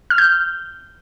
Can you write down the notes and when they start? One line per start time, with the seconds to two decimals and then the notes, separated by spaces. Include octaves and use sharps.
0.10 F6
0.18 G6